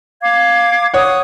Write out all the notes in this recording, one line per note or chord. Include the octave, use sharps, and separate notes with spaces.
F5 D6 G#6
C#5 F#5 D#6